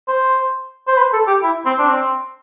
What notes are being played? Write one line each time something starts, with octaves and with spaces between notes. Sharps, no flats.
C5
C5
B4
A4
G4
E4
C4
D4
C4